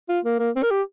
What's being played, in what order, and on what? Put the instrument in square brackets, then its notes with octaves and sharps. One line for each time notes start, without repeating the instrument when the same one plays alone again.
[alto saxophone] F4
A#3
A#3
C4
A#4
G4